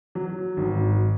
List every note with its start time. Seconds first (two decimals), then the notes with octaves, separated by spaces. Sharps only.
0.15 F#3
0.57 G#1